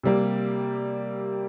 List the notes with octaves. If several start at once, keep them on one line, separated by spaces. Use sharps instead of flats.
C3 G3 A#3